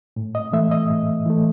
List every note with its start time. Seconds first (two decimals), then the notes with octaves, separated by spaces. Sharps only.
0.16 A2
0.35 D#5
0.53 E3 A3 E5
0.71 D#5
0.90 A2
1.26 E3 A3